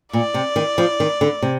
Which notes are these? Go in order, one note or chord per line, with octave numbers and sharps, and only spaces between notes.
A#2 D5
C3
D#3
F3
D#3
D3
C3